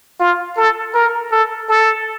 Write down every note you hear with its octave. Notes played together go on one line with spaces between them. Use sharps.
F4
A4
A#4
A4
A4